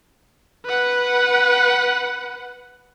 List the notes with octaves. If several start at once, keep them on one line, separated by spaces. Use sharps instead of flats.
B4 F#5